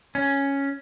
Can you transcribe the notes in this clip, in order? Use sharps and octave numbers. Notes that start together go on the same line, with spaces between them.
C#4